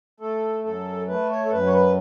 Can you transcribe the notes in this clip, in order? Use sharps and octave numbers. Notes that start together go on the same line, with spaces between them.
A3 A4
F#2 A4
A3 B4
C#5
A4
F#2 B4
C#5
B4